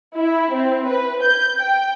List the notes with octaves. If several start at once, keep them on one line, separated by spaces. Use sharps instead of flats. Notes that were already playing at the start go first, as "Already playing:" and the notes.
E4
C4
B4
G6
G5